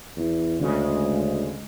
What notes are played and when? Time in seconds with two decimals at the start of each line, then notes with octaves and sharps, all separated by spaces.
0.16 E2
0.60 D2 C#3 G#3